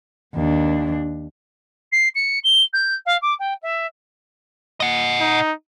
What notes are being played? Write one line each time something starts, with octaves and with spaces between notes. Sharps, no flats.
D#2 D4
C7
C#7
G7
G6
F5
D6
G5
E5
D#5 F#5
D#4